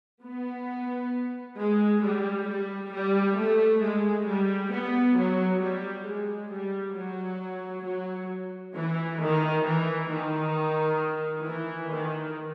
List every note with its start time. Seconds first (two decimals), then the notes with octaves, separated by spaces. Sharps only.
0.23 B3
1.58 G#3
2.03 G3
2.47 G3
2.93 G3
3.37 A3
3.82 G#3
4.27 G3
4.71 B3
5.17 F#3
5.61 G3
6.07 G#3
6.52 G3
6.96 F#3
7.85 F#3
8.75 E3
9.20 D#3
9.65 E3
10.10 D#3
11.44 E3
11.89 D#3